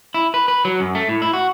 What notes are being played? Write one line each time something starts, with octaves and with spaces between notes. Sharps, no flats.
E4
B4
B4
F#3
F#2
A3
A2
E4
F#4